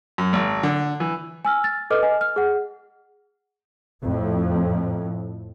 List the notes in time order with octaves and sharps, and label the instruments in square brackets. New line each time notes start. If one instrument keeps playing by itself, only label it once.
[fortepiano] F#2
G#1
D3
E3
[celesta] G#5 E6 F6
A6
A4 B4 D#5 D6 F6
D#5 G#5
F6
G#4 F#5
[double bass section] F2 A2